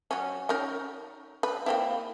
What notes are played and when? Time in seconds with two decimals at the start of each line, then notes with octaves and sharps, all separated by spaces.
0.11 F#3 C#4
0.49 C#4 D#4 A#4
1.43 B4
1.66 A#3 C4 E4